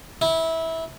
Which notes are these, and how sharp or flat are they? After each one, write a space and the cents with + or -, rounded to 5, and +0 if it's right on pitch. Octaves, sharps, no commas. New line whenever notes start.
E4 -20